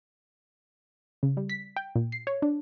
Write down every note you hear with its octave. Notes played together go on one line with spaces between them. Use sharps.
C#3
G3
B6
G5
A#2
C7
C#5
D4